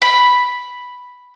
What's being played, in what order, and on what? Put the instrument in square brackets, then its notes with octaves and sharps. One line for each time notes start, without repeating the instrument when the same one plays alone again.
[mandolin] B5